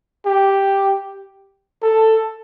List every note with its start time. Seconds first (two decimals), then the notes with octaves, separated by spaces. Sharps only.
0.26 G4
1.82 A4